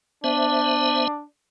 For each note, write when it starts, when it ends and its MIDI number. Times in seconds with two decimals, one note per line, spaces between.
0.24 1.08 59
0.24 1.24 62
0.24 1.08 72
0.24 1.08 76